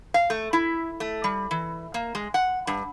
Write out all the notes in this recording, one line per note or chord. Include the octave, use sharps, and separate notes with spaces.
F5
A3
E4
A3
G3
E3
A#3
G#3
F#5
G2